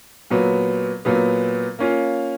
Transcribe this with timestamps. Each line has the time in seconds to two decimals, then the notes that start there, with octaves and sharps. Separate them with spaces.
0.30 A#2 F#3 B3
1.05 A#2 F#3 B3
1.79 A#3 C#4 F4